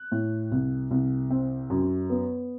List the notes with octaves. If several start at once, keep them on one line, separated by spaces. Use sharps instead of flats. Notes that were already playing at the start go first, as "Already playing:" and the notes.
Already playing: F#6
A2
C2
C2
C4
F#2
B3